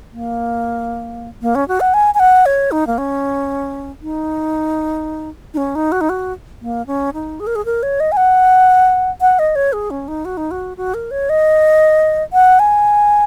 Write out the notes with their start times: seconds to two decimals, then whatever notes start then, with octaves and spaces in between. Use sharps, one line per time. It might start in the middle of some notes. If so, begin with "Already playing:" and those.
0.12 A#3
1.42 A#3
1.55 C#4
1.68 F#4
1.80 F#5
1.94 G#5
2.14 G#5
2.20 F#5
2.46 C#5
2.71 D#4
2.87 A#3
2.98 C#4
4.02 D#4
5.54 D#4
5.57 C#4
5.75 D#4
5.92 F#4
6.01 D#4
6.09 F#4
6.62 A#3
6.87 C#4
7.14 D#4
7.40 G#4
7.47 A#4
7.56 G#4
7.65 A#4
7.83 C#5
8.00 D#5
8.12 G#5
8.17 F#5
9.21 F#5
9.39 D#5
9.56 C#5
9.73 G#4
9.91 C#4
10.08 D#4
10.25 F#4
10.37 D#4
10.51 F#4
10.77 F#4
10.94 A#4
11.11 C#5
11.29 D#5
12.33 F#5
12.59 G#5